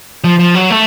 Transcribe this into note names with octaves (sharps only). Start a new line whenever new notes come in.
F3
F3
F#3
A3